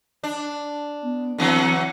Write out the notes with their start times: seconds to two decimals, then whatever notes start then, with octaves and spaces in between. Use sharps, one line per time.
0.24 D4
1.03 B3
1.38 D3 E3 F#3 C4